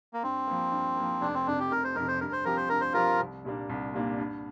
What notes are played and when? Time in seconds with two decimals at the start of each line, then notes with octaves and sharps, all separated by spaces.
0.13 A#3
0.23 G2 C4
0.47 F3 A#3
0.72 G2
0.96 A#3
1.02 F3
1.21 F1 D4
1.34 C4
1.47 F2 C3 D4
1.59 G4
1.71 F1 A#4
1.84 C5
1.95 F2 C3 A#4
2.08 C5
2.20 G2 A#4
2.32 C5
2.45 F3 C4 G4 A#4
2.57 C5
2.69 G2 A#4
2.81 C5
2.93 F3 C4 F4 G4 A#4
3.19 C2
3.45 A#2 G3 A#3 D4
3.69 C2
3.94 A#2 G3 A#3 D4
4.18 G2